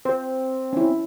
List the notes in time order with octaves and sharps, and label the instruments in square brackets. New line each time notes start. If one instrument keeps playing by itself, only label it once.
[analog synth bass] C4 [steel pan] C5
[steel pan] C#4 E4